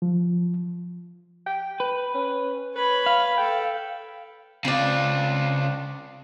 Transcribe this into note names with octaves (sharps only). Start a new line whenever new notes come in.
F3
G5
B4
C#4
B4 C#5 B5
F5
A4 G5
C#3 C4 D4 F4